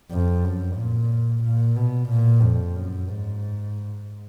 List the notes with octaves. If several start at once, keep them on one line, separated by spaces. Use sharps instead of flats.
F2
F#2
A#2
A#2
B2
A#2
F2
F#2
G#2